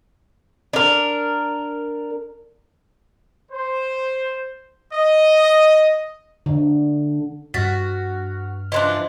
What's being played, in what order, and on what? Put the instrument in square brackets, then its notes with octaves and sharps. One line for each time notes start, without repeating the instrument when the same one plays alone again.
[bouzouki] D4 A#4
[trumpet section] C5
D#5
[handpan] D3
[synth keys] G2 F6 [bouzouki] F#4 [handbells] A6 B6
[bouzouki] E3 F3 D4 [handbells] D#5 C6 F#6